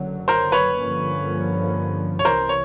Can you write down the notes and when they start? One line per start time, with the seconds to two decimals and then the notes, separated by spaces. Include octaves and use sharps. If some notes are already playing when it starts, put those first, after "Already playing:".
Already playing: F#1 F#2 D3 F#3
0.28 A#4 C5
0.52 B4 C#5
0.77 G2 D3 F3 A#3 C#4
2.19 C#5
2.25 C2 C3 E3 A#4 C5
2.49 C#5